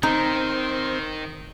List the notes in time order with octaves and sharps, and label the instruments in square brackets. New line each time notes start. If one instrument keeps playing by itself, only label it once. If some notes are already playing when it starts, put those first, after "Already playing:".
[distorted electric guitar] D#3 [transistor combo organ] C4 [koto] D#4